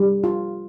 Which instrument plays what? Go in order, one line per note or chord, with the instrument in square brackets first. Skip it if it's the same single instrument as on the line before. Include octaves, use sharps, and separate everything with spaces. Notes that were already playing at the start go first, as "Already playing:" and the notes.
Already playing: [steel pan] G3
F4